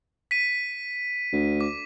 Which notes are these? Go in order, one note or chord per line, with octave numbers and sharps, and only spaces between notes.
B6 D#7
D2
D6